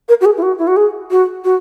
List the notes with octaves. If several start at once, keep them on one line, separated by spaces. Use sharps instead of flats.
A#4
F#4
G#4
E4
F#4
E4
F#4
G#4
F#4
F#4